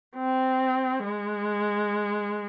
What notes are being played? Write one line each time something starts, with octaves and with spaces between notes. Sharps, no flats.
C4
G#3